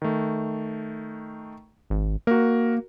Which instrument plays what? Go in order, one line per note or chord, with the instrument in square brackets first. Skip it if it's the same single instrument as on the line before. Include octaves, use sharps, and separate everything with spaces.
[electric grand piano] D#3 A3
[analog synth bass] G#1
[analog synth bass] A#3 [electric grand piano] F#4 A#4